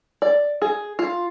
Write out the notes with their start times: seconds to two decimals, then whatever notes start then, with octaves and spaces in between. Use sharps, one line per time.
0.22 D5
0.62 G#4
0.99 F4